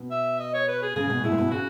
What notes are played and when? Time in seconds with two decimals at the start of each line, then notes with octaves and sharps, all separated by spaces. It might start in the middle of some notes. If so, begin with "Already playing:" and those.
Already playing: B2
0.11 E5
0.39 D#5
0.54 C#5
0.68 B4
0.82 G#4
0.96 C#3 G#4
1.10 B2
1.24 B2 E4
1.32 A#2
1.38 B2
1.51 C#3 F#4